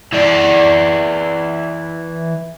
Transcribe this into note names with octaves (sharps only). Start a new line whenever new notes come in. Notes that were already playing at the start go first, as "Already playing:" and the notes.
E3 D5